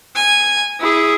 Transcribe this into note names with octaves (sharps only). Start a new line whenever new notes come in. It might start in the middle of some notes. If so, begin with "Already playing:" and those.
G#5
E4 G#4